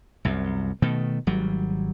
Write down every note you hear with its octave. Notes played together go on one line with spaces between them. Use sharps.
C2 F#2
B2 D#3 A3
G#1 F#3 G3